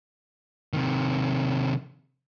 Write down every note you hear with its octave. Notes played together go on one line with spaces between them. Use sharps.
C3 D#3